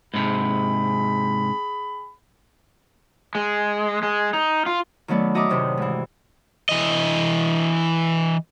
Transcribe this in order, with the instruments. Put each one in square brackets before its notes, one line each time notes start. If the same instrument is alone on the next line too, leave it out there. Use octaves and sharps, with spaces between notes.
[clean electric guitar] G#2 C3 [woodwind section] G#4 B5
[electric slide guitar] G#3
G#3
D#4
F4
[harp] D#3 F#3 A3 B3 D5
F#4 D#5 E5 A#5 D6 D#6
F#2 A2 C3 D#3
G#2 E3
[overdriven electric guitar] E3 D#5